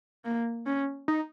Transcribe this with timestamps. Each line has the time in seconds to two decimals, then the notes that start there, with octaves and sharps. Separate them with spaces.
0.25 A#3
0.66 C#4
1.08 D#4